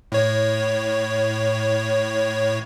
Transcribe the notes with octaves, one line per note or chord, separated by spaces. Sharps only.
A2 C#5